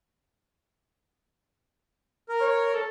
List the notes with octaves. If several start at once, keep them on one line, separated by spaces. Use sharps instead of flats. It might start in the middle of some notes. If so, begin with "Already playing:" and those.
A#4
C#5
A4